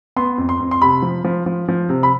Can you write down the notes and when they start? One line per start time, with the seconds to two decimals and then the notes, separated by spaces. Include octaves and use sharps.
0.16 B3 C6
0.38 F2
0.49 C6
0.60 F2
0.71 C6
0.82 C3 B5
1.02 F3
1.24 F3
1.46 F3
1.68 F3
1.89 C3
2.03 B5